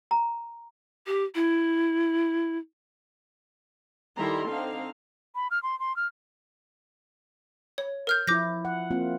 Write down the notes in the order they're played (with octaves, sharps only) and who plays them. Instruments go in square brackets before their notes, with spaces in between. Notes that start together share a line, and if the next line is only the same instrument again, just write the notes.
[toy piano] A#5
[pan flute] G4
E4
[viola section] D#3 G3 E4 A4 A#5 C6
D3 C4 D#4 F5
[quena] B5
F6
C6
C6
F6
[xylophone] C#5
A#4 F6 G6
[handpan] F3 E4 [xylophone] D6 G6 A#6
[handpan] F#5
A#3 C4 F4